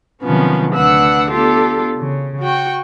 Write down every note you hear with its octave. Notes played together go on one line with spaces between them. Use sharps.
C3 D#3 F3 F#3 B3 C#4
D2 D4 B4 F#5 E6
B3 D4 F4 G4 A4
C#3
F#4 G5 C#6